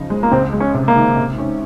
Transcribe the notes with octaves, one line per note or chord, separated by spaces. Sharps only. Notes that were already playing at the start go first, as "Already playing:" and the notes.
Already playing: C#3 F3 D#4
G#3
A#3
C#2 C4
G#3
C#4
C3
A#3
D#3
C3
C#4